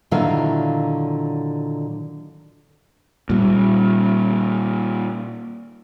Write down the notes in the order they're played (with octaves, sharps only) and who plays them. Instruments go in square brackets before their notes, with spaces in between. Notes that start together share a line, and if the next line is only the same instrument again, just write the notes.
[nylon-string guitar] A#2 D3 D#3 F#3 E4 F5
[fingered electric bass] A#2 G3